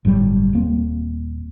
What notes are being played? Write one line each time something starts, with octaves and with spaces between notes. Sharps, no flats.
G1 A2 F#3 G3
D#1 A#3 C4